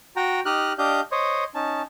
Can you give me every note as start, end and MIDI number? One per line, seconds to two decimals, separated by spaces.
0.16 0.40 66
0.16 0.40 79
0.16 0.40 82
0.46 0.73 63
0.46 0.73 67
0.46 0.73 75
0.46 0.73 89
0.46 0.73 90
0.78 1.01 62
0.78 1.01 67
0.78 1.01 75
0.78 1.01 77
0.78 1.01 91
1.12 1.44 72
1.12 1.44 73
1.12 1.44 75
1.55 1.82 61
1.55 1.82 63
1.55 1.82 81